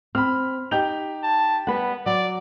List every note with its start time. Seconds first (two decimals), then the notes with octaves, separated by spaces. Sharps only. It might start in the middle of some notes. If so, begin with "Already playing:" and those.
0.15 C4 B5 F6
0.71 D#4 G4 G6 F7
1.23 A5
1.67 G3 B3 B4 F#5
2.06 F#3 D5